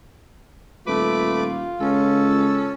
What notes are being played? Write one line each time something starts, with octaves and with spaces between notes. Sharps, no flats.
D#1 A3 F4 B4 D6
C#2 C#4 A4